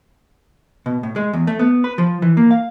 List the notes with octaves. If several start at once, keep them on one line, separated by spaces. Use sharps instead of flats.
B2
A2
G#3
E2
A3
B3
B4
F3
E3
A#3
F5